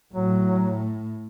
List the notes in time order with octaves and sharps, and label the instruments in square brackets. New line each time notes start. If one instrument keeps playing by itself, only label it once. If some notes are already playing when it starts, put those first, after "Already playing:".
[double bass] A2 [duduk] F#3